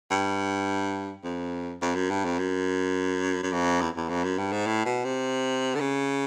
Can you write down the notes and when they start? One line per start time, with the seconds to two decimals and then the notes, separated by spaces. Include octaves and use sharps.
0.11 G2
1.24 F2
1.82 F2
1.95 F#2
2.10 G2
2.24 F2
2.39 F#2
3.43 F#2
3.52 F2
3.81 E2
3.97 E2
4.09 F2
4.24 F#2
4.39 G2
4.52 G#2
4.67 A2
4.85 B2
5.05 C3
5.75 D3
5.80 C#3